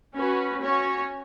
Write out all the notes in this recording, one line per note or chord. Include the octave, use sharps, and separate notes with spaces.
C#4 F#4 B4
C#4 F#4 C#5